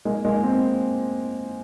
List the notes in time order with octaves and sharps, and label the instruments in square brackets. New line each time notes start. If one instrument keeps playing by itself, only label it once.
[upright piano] G#3 A#3
G#3 A#3
A#3 C4